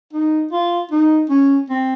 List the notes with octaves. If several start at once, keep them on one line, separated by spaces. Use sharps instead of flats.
D#4
F4
D#4
C#4
C4